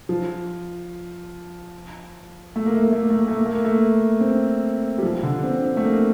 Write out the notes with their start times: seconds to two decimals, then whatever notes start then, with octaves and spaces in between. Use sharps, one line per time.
0.09 F3
2.56 A3
2.66 A#3
2.74 A3
2.84 A#3
2.92 A3
3.01 A#3
3.10 A3
3.20 A#3
3.28 A3
3.37 A#3
3.46 A3
3.55 A#3
3.64 A3
4.21 C4
4.98 G3
5.02 F3
5.23 D3
5.44 C4
5.65 C4
5.77 A3
5.85 A#3